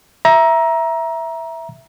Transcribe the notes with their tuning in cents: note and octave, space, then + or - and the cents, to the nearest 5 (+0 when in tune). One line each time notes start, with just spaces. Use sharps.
E5 +0 A#5 +20